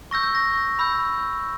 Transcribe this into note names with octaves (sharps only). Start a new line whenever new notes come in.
C#6 E6 G6 A#6
G6
A#6
B5 E6 G6